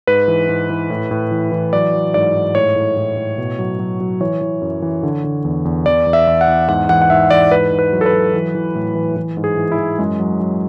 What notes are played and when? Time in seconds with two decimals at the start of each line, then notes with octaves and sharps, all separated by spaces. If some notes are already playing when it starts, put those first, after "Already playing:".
0.07 G#2 B4
0.28 E3
0.49 G#2
0.70 E3
0.90 A2
1.11 A2
1.31 E3
1.52 E3
1.73 F#3 D5
1.94 F#3
2.14 G#2 D5
2.35 G#2
2.55 A2 C#5
2.76 A2
2.97 A2
3.17 A2
3.38 B2
3.59 F#3
3.79 F#3
4.00 F#3
4.20 E3 C#5
4.41 E3
4.62 F#2
4.82 E3
5.03 D3
5.24 D3
5.45 E2
5.65 E2
5.86 E2 D5
6.07 E2
6.13 E5
6.27 E2
6.41 F#5
6.48 E2
6.68 G#2 F#5
6.89 E3 F#5
7.02 F#5
7.10 G#2 E5
7.30 E3 D5
7.51 G#2 B4
7.72 G#2
7.79 B4
7.93 F#3
8.01 A4
8.06 B4
8.13 F#3
8.34 E3
8.55 E3
8.75 A2
8.95 E3
9.17 E3
9.37 G#2
9.44 G#4
9.57 E3
9.72 E4
9.78 E3
9.99 F#2 G#3
10.20 F#3
10.40 F#3